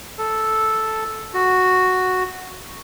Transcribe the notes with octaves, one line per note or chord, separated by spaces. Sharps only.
A4
F#4